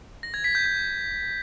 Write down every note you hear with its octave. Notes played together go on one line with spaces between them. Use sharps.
A#6
G#6
B6
G6
G6